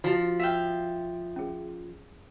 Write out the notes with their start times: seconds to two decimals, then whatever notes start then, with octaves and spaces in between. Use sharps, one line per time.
0.04 F3 E4 F#4 D#5
0.39 E5 F5 G5
1.36 C#4 G#4